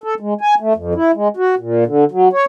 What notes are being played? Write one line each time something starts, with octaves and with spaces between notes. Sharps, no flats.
A4
G#3
G#5
A3
F2
E4
G#3
F#4
A#2
D3
F#3
C#5